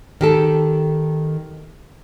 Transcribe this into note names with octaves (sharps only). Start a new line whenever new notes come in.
D#3 G4 A4